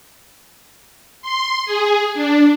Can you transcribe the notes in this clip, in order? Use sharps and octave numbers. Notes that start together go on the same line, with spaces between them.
C6
G#4
D4